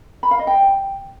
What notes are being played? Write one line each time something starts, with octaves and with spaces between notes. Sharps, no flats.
B5
F5
D#5
G5